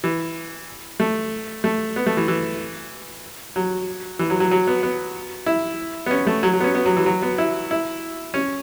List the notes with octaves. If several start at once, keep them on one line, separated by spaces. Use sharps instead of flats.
E3
A3
A3
B3
A3
E3
E3
F#3
E3
F#3
F#3
F#3
B3
B3
E4
B3
C#4
A3
F#3
F#3
B3
C#4
B3
F#3
E3
F#3
B3
E4
E4
C#4